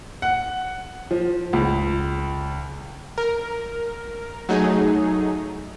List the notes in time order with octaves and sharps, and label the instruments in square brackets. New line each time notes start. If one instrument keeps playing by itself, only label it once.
[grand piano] F#5
F3
C#2
[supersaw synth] A#4
F#3 A3 D#4 G#4